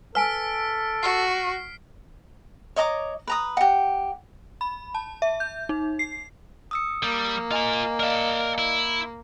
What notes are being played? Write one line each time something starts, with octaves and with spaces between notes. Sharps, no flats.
A4 B4 G#5 F6 B6 D7
F#4 C7
C#5 D#5 A#5 D6
B4 A#5 D#6
G4 F#5
B5
A5
E5
G6
D#4
C7
D#6 E6 C#7
G3 A#3
F4 D#5 G#5 A#5
A#4 D5 D#5 F5 A5
E4